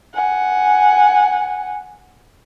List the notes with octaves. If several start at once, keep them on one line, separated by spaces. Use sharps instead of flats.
F#5 G#5